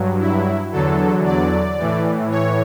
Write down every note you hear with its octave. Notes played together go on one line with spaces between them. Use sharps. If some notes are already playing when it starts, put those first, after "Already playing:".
Already playing: G2 F#3
E4
E2 D3 F#3 A4
D5
A2 E3
C#5